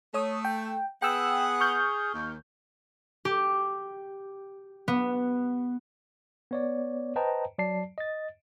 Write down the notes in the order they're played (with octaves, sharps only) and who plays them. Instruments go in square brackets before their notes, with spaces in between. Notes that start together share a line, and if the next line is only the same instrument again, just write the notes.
[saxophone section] A3 [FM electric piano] C#5 D#6
[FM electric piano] G5
[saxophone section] B3 F#5 [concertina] G#4 [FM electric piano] G5 E6
[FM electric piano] C#6 F6 G6
[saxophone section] D#2
[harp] G4
B3
[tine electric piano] B3 C#5 D5
B4 C5 D#5 G5 A5 A#5
F#3 D5 A5 C7
D#5 A6